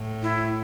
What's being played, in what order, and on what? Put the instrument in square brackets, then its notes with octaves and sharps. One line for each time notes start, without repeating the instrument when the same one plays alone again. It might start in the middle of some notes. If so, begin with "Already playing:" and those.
Already playing: [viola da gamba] A2
[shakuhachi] E4